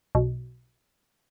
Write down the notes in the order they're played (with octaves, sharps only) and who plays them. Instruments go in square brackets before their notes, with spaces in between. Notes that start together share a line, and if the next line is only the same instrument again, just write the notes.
[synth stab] B1